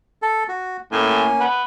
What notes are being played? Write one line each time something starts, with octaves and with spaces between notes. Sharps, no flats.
A4
F#4
A2 A#3 C#4 G#5
B3